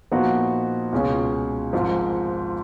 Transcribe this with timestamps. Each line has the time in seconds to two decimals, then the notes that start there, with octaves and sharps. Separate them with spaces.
0.12 A#2 F3 B3 D#4 F#4
0.93 C#2 B2 G#3 C#4 F4
1.73 G#1 G#2 F3